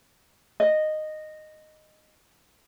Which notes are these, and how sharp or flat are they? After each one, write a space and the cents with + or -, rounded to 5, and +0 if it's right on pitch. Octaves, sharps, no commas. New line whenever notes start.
D#5 -10